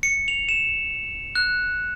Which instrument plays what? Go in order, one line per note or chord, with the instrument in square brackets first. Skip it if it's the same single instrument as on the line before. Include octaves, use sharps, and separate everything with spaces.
[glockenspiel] C#7
F7
E7
F#6